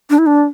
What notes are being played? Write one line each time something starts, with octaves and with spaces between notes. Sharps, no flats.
D4
E4
D4